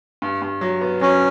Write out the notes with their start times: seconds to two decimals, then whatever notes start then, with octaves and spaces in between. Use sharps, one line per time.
0.22 G2
0.42 G2
0.61 F#3
0.81 B3
1.01 F#3 C#4